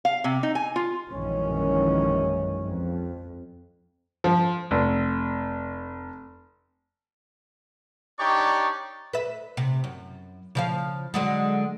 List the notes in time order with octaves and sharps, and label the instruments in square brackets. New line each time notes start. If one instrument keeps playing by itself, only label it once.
[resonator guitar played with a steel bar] F5
C3
D#4
G#5
F4
[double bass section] A#1 F#2 D#3 E3 G#3 C#4
F2
[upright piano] F3
F1
[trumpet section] D4 D#4 G4 C#5 D5 C#6
[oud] B4 E5
C3
F#2
C#3 F3 F5
D3 F#3 G#3